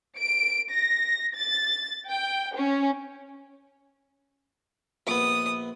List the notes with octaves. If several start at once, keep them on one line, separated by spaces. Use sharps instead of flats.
D7
A#6
A6
G5
C#4
A#1 B3 D#6